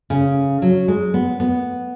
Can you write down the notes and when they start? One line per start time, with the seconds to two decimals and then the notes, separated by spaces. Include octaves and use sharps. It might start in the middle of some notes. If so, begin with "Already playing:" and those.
0.10 C#3
0.62 F#3
0.88 G#3
1.14 B3
1.40 B3